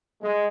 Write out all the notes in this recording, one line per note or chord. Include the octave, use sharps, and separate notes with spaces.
G#3